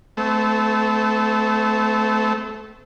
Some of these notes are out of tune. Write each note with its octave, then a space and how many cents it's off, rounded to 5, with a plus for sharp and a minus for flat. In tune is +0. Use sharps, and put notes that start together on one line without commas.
A3 -15 C4 -45